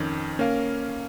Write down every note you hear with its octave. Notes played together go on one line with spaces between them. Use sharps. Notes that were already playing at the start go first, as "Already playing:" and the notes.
Already playing: F2 D#3 C#4
A#3 C#4 A#4 F5